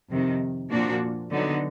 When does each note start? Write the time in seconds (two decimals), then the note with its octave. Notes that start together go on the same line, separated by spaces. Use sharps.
0.10 F2 C3 D#3
0.70 A#2 F3 A#3 D4 F#4
1.30 D3 F#3 B3 D#4